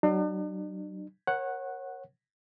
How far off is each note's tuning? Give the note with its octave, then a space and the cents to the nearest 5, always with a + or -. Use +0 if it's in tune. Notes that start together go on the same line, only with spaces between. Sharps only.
F#3 +35 D4 +45
A#4 +20 C#5 -30 F#5 +0